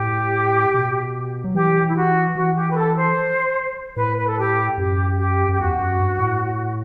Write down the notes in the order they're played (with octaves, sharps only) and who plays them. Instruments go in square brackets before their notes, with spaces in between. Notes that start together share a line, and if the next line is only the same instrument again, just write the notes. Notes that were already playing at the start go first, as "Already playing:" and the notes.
Already playing: [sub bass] A2 [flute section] G4
[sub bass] B2
F#3
[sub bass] E3 [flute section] G4
[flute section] E4
F#4
[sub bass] E3 [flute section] F#4
[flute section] G4
B4
A4
C5
[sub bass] A2 [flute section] B4
[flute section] B4
A4
G4
[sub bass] F#2 [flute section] G4
[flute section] G4
[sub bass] F#2 [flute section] G4
[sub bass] E2 [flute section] F#4
[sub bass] F#2
G2
A2